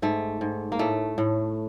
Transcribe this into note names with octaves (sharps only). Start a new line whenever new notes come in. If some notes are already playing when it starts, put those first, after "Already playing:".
G#2 A3
G#2
A#3
A2 A3
A2